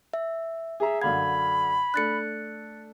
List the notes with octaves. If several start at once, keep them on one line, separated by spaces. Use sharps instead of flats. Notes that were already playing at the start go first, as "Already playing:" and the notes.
E5
G#4 E5 A#5
F#2 D3 F5 B5 G#6
A3 D4 F#6 A6 C#7